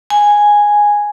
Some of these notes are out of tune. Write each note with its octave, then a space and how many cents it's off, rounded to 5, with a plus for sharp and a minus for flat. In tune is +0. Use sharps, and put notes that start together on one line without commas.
G#5 -5